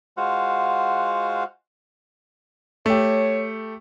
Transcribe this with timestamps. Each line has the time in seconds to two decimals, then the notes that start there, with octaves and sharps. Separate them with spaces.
0.17 G#3 F4 F#4 C5 F5 F#5
2.86 A3 G4 C#5